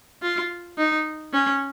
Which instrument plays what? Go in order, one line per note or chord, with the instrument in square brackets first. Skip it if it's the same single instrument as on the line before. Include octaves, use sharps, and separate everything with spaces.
[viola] F4
D#4
C#4